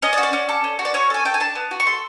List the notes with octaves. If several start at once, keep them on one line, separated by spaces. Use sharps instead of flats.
C#4 D#5
D5
F#4
D5
C#4
A4
C#4
F#4
D5
C#4 C#5
A4 G#5
A4 G5
G#5
D4 A5
B3
F#4
C#6
A4 C6